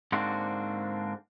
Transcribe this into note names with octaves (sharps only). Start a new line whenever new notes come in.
G#2 D3 A#3 C4 D4 F#4